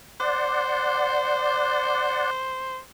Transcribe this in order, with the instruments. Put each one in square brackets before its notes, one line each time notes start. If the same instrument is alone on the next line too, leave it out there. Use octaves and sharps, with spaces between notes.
[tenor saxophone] C5 [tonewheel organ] D5 F#5